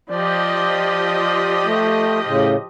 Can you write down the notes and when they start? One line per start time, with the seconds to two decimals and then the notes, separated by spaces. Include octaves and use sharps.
0.10 F3 G4 D5 D#5
1.66 A3
2.26 A2 C#3